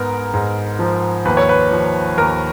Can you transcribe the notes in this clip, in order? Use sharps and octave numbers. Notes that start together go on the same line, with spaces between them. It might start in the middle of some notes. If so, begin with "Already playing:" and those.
Already playing: G#2 B3 A#4
G#2
F3
D#2 B4
C#5
B4
F3
D#2 A#4